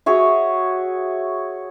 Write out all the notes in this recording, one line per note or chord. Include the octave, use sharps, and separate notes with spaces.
F#4 G#4 C#5 E5